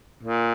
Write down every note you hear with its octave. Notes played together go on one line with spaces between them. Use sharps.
A#2